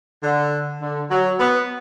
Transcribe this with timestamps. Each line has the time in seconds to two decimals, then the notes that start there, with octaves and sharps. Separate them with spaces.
0.23 D3
0.80 D3
1.10 F#3
1.39 B3